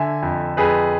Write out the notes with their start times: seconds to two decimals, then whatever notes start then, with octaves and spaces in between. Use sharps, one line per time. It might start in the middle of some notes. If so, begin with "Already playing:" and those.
Already playing: D3 E5 G#5
0.23 F2
0.57 F2 G#4 B4